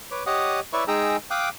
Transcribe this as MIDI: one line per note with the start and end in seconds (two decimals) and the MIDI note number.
0.11 0.23 71
0.11 0.23 73
0.11 0.23 86
0.26 0.60 67
0.26 0.60 73
0.26 0.60 75
0.26 0.60 78
0.26 0.60 87
0.73 0.84 64
0.73 0.84 71
0.73 0.84 73
0.73 0.84 74
0.73 0.84 76
0.73 0.84 85
0.88 1.17 56
0.88 1.17 63
0.88 1.17 68
0.88 1.17 79
0.88 1.17 82
0.88 1.17 88
1.31 1.49 77
1.31 1.49 79
1.31 1.49 86
1.31 1.49 87
1.31 1.49 90